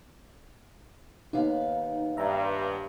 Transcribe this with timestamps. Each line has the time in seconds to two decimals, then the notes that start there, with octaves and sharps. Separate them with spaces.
1.33 D#2 B3 D#4 F5
2.17 G2 E5 A#5